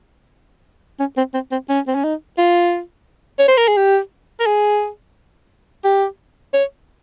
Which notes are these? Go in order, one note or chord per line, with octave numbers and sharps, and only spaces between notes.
C#4
C4
C4
C4
C#4
C4
C#4
D#4
F4
C#5
C5
A#4
G#4
G4
A#4
G#4
G4
C#5